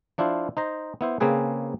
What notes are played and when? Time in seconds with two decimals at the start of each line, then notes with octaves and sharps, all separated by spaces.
0.18 F3 D4 E4 F4 C5
0.57 D#4 C5 A#5
1.01 B3 E4 C5
1.20 C#3 A#3 C4 G#4 B4